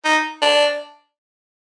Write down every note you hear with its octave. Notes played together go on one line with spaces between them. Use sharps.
D#4
D4